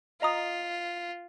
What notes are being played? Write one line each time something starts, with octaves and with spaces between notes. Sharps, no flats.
F4 D#5 A#5 D#6